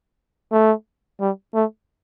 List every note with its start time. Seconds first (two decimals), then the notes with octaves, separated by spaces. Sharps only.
0.52 A3
1.20 G3
1.54 A3